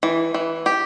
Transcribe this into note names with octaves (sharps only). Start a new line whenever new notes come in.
E3
E3
G4